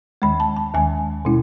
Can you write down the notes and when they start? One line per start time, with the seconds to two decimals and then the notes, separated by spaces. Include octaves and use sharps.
0.22 D#2 D#3 G#3 B5
0.40 A5
0.57 A5
0.74 D#2 D#3 G#3 G#5
1.25 B2 G#3 C#4 E4